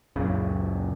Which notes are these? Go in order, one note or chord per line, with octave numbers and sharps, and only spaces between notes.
C#2 F#2 A#2 C#3